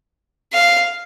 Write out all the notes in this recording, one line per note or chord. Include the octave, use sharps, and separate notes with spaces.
F5